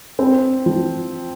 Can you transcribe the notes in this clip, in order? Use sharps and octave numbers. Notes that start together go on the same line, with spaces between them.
C4
F3